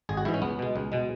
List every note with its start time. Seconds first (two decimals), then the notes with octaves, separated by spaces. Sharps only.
0.09 G#1 G#4
0.17 F#4
0.25 G#2 E3 E4
0.34 C#4
0.42 C#2 B3
0.59 B2 G#3
0.76 C#2
0.92 B2 G#3